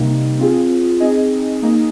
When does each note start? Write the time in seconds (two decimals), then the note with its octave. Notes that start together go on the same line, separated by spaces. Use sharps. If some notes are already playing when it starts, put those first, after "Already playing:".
Already playing: C3 G3 A#3 D#4
0.39 C4 F4 G#4
1.00 C4 D#4 G#4 D#5
1.63 A#3 D#4 G#4 D#5